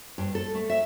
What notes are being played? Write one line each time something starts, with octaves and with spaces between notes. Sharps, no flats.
G2
A4
A3
E5